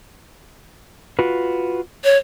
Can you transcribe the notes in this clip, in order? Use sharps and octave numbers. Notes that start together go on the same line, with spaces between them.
F4 F#4 B4
C#5